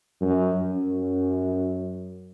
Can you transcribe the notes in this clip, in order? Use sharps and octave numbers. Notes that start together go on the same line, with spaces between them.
F#2
F#2